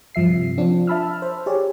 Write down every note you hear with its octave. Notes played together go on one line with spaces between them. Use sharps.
G2 F3 E5 C7
C3
F3 C4 D4 F4
E5 A5 B5 E6 F6
C5
G4 G#4 C#5 D5